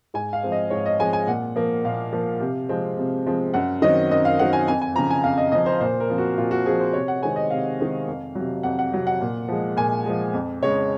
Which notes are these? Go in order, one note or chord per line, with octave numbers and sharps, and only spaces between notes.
G#2 G#5
F5
F3 G#3 C4
D#5
G#2 C#5
D#5
F3 G#3 C4 G#5
G#5
A#2 F#5
F3 A#3
A#2 F5
F3 A#3
C3
F3 G#3 C4
C3
F3 G#3 C4
F#2 F#5
D#3 F#3 C4 D#5
F#2 D#5
F5
D#3 F#3 C4 F#5
G#5
F2 G#5
G#5
C#3 F3 A#5
G#5
F2 F5
D#5
C#3 F3 D#5
C5
A#2 C5
A#4
F3 C4
F#4
A#2 F4
F#4
F3 C4 G#4
C5
C3 C#5
F#5
D#3 G#3 C4 G#5
D#5
C3 F5
D#3 G#3 C4
F2
C3 F#3
F2 F#5
F#5
C3 F#3
F#5
A#2
F3 G#3
A#2 G#5
F3 G#3
F2
C#3 G#3 C#5